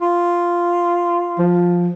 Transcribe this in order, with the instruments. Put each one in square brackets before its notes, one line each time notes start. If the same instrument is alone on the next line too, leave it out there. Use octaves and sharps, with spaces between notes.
[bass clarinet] F4
[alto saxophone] F3